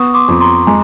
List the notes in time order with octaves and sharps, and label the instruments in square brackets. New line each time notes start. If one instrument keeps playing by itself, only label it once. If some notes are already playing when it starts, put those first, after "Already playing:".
Already playing: [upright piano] B3 [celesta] C#6 D#6
[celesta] C6 D6
[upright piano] F2
[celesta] A#5 C6
[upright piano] G#3 [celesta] G#5 A#5